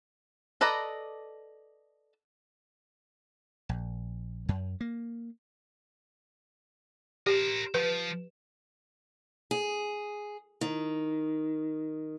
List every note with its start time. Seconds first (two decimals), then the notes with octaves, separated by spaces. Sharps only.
0.61 A4 B4 D5 D#5 A#5
3.69 A#1
4.49 F#2
4.81 A#3
7.27 G4 A#4 C5
7.74 F3 B4
9.51 G#4
10.61 D#3